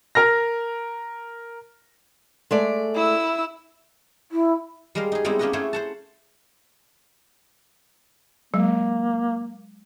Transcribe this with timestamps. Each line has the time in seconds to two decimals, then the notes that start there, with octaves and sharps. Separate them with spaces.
0.15 A#4 F6 A#6
2.51 G#3 A3 D5
2.95 E4 E6
4.32 E4
4.95 G3 G#3 A#4 C5 F5
5.12 D#4 G#4
5.25 G3 G#3 B3 C4 D#4 E4
5.39 A#3 C#4 G4 B4 D#5 F#5
5.53 A3 C#4 E4 G#4 C5 C#5
5.73 C5 F#5 A5
8.54 F#3 G#3 A#3